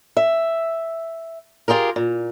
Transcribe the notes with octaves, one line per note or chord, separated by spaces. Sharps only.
E5
F4 G4 G#4 A#4
A#2